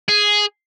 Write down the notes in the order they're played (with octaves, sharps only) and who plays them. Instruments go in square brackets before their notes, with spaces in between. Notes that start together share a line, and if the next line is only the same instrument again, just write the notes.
[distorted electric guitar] G#4